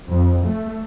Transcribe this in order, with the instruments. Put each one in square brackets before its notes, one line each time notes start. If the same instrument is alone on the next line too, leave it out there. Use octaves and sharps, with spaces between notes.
[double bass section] F2
A3